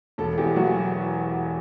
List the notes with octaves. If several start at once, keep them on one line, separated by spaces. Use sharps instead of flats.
E1 A4
E2 G4
F#3 F#4